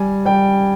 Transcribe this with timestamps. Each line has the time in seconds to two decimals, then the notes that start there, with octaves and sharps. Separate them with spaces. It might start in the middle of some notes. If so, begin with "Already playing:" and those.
Already playing: G3 G#5
0.25 G3 G5